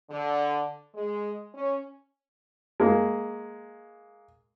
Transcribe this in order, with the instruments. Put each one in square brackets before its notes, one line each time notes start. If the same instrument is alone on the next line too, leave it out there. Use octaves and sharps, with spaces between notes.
[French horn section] D3
G#3
C#4
[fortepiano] G#3 A#3